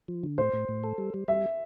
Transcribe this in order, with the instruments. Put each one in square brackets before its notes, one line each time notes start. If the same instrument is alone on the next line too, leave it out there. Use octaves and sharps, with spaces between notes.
[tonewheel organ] F3
D3
[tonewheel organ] A2 [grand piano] C5
[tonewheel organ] A2
A2
A4
G3
G3
[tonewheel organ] G3 [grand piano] E5